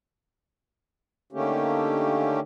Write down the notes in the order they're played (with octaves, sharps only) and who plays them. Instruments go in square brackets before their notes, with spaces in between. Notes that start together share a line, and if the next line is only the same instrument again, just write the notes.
[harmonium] D3 D#3 A3 A#3 C#4 G4